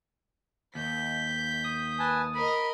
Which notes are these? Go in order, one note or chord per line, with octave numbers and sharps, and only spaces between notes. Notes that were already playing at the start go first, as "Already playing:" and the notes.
D#2 G6 B6
D#6
B4 G#5 A5
A#4 D#5 B5